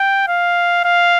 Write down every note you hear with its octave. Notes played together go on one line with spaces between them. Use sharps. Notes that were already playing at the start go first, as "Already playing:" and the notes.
Already playing: G5
F5
F5